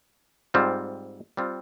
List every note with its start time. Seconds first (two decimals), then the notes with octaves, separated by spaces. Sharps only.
0.54 G#2 G3 C4 F4
1.37 G3 C4 F4